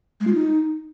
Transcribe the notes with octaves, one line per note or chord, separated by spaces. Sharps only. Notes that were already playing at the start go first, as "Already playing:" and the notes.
G#3
F4
D#4